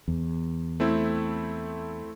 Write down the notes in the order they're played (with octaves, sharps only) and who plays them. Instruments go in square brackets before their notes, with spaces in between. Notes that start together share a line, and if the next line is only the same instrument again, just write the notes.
[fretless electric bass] E2
[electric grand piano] A3 C4 E4